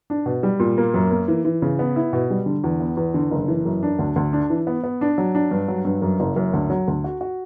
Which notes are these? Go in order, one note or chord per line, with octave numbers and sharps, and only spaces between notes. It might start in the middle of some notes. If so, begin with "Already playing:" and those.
D4
B2
G3
A#2
A#3
F#2
A#3
E3
E3
C#3
B3
E4
B2
G3
D3
E2
B3
E2
D3
F#1
E3
F#2
D4
D2
D2
D4
E3
B3
B3
D4
F#3
D4
G2
F#3
G2
F#2
F#1
F#2
D2
F#3
D2
F#4
F#4